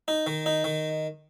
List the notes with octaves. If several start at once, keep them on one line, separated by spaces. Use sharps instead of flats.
D#4
D#3
D#4
D#3